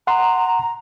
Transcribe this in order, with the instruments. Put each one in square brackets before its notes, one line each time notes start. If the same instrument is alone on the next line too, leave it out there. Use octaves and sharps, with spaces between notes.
[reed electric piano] F#5 C6 [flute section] A#5